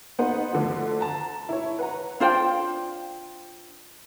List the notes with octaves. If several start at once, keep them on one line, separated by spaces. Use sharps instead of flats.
B3 D#4 C5 F#5
D2 D3 F3
A5 A#5
E4 C#5
B4 F#5 A#5
D4 F4 C5 G5